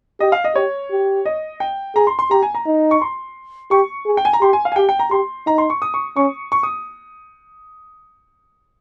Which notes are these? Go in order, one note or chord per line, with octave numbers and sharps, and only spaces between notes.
G4 D#5
F5
D#5
G4 C#5
G4
D#5
G5
G#4 A#5
C6
C6
G4 A#5
G#5
A#5
D#4
C#6
C6
G4 C#6
G#4
G5
G#5
A#5
G4 C6
G#5
F5
G#5
G4 G5
G5
A#5
G4 C6
D#4 A#5
C6
C#6
D#6
C#6
C#4 C#6
C#6
D#6